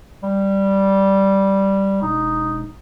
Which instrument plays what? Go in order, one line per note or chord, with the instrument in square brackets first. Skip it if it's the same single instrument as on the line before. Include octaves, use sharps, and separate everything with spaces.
[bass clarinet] G3
[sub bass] E1 [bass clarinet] D#4